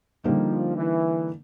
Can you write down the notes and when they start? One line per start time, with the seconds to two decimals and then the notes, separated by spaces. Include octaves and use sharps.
0.24 D3 F3 G3 A#3 D#4
0.76 E3